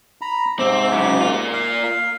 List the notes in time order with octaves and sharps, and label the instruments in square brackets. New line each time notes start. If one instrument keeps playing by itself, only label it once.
[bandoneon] A#5 B5
[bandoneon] G#2 C3 D6 [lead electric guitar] C4
[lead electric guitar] C#3 F#3
A#3 F4
[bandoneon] F5